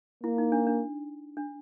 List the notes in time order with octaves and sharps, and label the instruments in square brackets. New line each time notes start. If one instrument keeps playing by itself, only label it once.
[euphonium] A#3 [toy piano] E4
[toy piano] D#4
D4
D4
D4